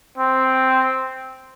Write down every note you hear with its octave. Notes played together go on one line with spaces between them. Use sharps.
C4